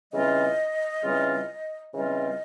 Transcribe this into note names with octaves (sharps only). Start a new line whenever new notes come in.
C#3 E3 G3 C4 F4 D#5
C#3 E3 G3 C4 F4
C#3 E3 G3 C4 F4 D#5